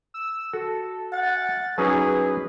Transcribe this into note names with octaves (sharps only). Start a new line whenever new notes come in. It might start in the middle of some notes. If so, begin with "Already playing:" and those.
E6
F#4 A4
F#5 A6
F#3 C#4 D#4 G#4 B4